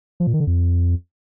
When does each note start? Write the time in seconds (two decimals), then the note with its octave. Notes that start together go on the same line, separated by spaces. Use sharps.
0.20 F3
0.27 A#2
0.33 D#3
0.40 D3
0.47 F2